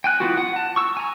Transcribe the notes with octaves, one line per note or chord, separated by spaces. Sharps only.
G5 G#5 F#6
E3 B3 F4 F#4
F#5
A5
C#6 E6
G#5 A#5